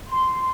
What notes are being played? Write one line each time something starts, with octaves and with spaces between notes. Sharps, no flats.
C6